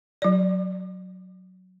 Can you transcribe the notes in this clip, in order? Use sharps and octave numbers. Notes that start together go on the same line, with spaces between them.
F#3 D5